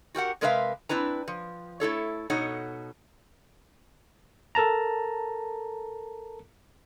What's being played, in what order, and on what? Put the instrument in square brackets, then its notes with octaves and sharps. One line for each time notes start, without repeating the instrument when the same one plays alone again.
[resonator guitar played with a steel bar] F#4 G4 A#4 F#5
C3 G#3 A#4 B4 E5 F5
C4 D4 E4 B4 A#5
F3
A3 E4 A4 C#5
B2 D#4 A4 C#5 F#5
[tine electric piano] A4 A#4 A5 A#5